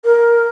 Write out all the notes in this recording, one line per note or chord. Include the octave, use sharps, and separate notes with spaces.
A#4